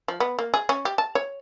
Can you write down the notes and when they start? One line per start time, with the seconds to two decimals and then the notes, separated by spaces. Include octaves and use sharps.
0.08 F3
0.20 B3
0.39 A#3
0.54 G#4
0.69 C#4
0.85 G4
0.98 A5
1.15 C#5